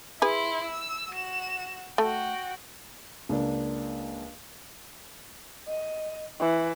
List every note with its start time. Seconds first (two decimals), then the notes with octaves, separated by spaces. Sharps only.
0.22 E4 G#4 B4 C6
0.64 E6
1.11 F#4 E7
1.98 A3 F#4 G5
3.29 C#2 A#3 D4
5.69 D#5
6.40 E3